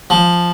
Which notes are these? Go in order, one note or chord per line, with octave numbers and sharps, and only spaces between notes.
F3